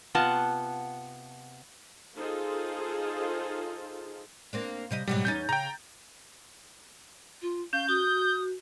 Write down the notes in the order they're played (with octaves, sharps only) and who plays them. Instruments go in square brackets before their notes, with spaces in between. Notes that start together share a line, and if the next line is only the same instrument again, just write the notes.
[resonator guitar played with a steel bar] C3 B3 F4 F#5 A5
[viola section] D#4 F4 G#4 A4 C5 F5
[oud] A#3 C4 D4
C3 G3 D#5
[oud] G#2 B2 F#3 [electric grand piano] G3
[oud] E2 C#4 D#4 [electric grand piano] G6 A6
[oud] C#3 [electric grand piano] G5 A#5
[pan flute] F4
[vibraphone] C#4 [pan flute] F5 [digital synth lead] G6
[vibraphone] F#4 [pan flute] D#6